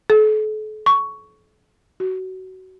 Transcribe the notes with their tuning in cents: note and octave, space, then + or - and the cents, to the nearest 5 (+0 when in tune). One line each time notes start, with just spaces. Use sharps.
A4 -40
C#6 +10
F#4 +20